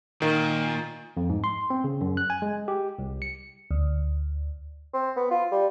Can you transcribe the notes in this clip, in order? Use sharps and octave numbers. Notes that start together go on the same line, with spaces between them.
A#2 D#3
F2
G#2
C6
C4
C#3
F#2
F#6
G#5
G#3
G4
C2
C#7
D2
C4
B3
F4
G3